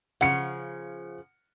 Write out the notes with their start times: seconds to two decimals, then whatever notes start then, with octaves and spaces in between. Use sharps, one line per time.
0.21 C#3 F3 F#5 C#7